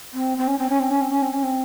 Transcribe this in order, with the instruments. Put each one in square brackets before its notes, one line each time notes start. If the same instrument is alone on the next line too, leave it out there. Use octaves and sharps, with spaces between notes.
[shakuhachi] C4
C4
C#4
C4
C#4
C4
C#4
C4
C#4
C4
C#4
C4